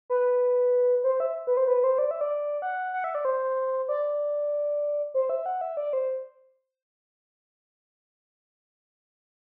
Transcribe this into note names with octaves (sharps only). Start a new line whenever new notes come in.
B4
C5
E5
B4
C5
B4
C5
D5
E5
D5
F#5
F#5
E5
D5
C5
D5
C5
E5
F#5
E5
D5
C5